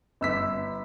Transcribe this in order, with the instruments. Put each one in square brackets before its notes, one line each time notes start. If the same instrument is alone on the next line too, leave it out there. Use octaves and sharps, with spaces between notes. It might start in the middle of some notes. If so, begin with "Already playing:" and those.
[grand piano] G1 E6 B6